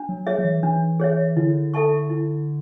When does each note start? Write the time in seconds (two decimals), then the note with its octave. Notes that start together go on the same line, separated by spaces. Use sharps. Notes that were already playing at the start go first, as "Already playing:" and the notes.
Already playing: D4
0.09 F#3
0.27 G#4 C#5 E5
0.38 F#3
0.45 E3
0.63 E3 D4
1.00 G#4 C#5 E5
1.37 D3 E4
1.74 A4 E5 A5 C#6
2.10 E4